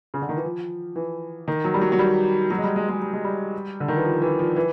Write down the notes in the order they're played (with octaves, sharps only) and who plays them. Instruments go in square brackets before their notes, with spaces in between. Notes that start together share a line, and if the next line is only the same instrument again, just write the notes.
[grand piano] C#3
D3
D#3
E3
F3
E3
D#3
F#3
G3
F#3
F#3
G3
F#3
G#3
G3
G#3
G#3
G3
G#3
G3
D3
D#3
E3
F3
E3
F3
E3